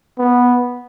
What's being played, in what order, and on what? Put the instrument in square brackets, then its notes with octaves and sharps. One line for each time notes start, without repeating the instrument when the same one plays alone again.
[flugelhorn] B3